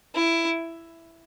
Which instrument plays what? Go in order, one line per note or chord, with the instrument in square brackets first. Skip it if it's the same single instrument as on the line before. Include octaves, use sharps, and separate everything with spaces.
[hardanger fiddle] E4